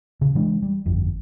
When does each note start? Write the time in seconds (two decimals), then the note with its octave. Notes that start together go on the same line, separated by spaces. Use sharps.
0.21 C#3
0.35 E3 G#3 D4
0.62 G3
0.86 G1 F2